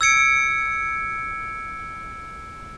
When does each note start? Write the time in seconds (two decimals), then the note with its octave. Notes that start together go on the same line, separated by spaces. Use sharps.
0.01 E6 G#6 C#7 D7